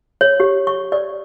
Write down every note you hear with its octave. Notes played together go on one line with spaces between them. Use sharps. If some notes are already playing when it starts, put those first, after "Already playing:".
C#5
G4
C#6
D5